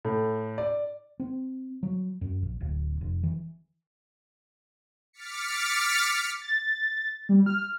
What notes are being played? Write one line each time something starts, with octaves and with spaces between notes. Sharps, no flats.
A2
D5
C4
F#3
F#2
A#1
D1
F1
E3
D6 F6 A6 B6 C#7
A6
G3
F6